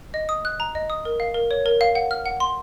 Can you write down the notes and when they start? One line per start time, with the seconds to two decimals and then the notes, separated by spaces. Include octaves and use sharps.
0.14 D#5
0.29 D#6
0.45 F#6
0.60 A#5
0.75 D#5
0.90 D#6
1.05 A#4
1.20 F5
1.34 A#4
1.51 C#5
1.66 A#4
1.81 F5
1.95 F#5
2.11 F6
2.26 F#5
2.40 C6